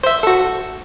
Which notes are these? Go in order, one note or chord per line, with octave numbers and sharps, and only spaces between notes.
C5 E5
F#4 A4